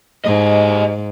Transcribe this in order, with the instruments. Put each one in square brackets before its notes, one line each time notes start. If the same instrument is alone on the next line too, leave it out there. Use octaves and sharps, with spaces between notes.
[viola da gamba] G#2 [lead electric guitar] G4 D#5